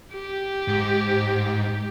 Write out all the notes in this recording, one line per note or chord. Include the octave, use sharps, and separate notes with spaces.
G4
G#2